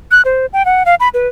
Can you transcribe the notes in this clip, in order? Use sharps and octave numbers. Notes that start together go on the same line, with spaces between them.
F#6
C5
G5
F#5
F5
B5
B4